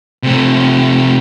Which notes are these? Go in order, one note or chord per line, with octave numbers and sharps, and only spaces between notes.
C3 A3